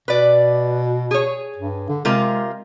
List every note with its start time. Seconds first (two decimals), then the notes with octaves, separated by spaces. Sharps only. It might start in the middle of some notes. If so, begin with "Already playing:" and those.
0.08 B2 B4 D5
1.11 G#4 C#5
1.57 G2
1.89 D3
2.05 C3 G#3 F4 A#4